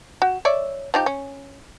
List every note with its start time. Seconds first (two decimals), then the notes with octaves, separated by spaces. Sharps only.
0.22 F#4
0.45 C#5 D5 E5
0.94 F3 D#4 G4
1.06 C#4